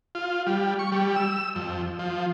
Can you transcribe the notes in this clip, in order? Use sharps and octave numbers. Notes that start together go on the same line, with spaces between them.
F4
G3
C#6
G3
E6
F2
F3